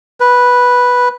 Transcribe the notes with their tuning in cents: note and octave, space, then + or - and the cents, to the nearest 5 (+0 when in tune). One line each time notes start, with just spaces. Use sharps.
B4 -5